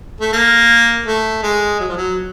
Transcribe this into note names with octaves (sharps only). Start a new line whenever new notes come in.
A3
A#3
A3
G#3
F#3
F3
F#3